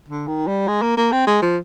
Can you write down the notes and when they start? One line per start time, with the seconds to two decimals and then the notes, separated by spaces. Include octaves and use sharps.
0.08 D3
0.27 D#3
0.47 G3
0.68 G#3
0.82 A#3
0.97 A#3
1.12 C4
1.27 G#3
1.42 F3